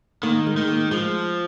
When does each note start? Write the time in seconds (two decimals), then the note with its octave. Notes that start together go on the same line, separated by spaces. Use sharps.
0.23 D#3 A#3
0.47 G#3
0.57 D#3
0.68 A#3
0.91 F3 G#3